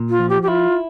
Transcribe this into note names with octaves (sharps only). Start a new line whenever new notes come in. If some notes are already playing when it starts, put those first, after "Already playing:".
Already playing: A#2
F4
F3
G4
G4
E4 F4